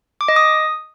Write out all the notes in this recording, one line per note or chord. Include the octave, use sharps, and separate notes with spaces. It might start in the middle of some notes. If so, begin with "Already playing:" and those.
D6
D#5
D#6